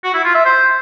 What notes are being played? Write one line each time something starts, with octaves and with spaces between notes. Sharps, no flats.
F#4
E4
F4
E5
C5